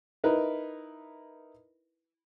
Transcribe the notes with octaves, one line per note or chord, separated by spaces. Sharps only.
D#4 E4 A#4 B4